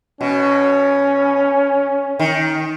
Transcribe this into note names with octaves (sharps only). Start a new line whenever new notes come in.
B2 C#4
D#3